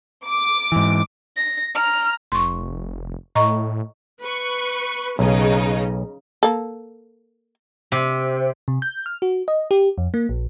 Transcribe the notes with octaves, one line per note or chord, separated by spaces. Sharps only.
D6
G#2 E3
A#6
A#5 F6
F1 C6 C#6
A2 D#5 A#5 C#6
B4 C#6
B1 C#3 D#4
A#3 A4
C3
C3
G6
F6
F#4
D#5
G4
F2
A#3
A#1